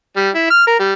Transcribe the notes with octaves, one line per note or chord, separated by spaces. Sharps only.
G3
E4
F6
A#4
G3